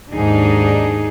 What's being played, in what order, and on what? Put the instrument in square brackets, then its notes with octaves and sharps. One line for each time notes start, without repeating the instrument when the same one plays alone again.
[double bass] D#2 G#2 [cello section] D4 D#4 G#4